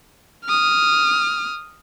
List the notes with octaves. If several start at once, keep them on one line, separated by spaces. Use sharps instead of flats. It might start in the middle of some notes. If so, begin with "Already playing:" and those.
D#6 F6